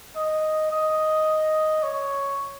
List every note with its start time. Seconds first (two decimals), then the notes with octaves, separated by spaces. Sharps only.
0.16 D#5
0.71 D#5
1.83 C#5